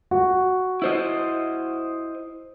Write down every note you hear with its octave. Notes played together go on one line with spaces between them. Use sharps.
F#4
E4 C5 D#5